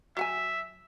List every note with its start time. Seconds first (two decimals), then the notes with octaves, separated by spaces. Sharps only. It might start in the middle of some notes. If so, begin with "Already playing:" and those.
0.17 F#3 E5 F#5 G#5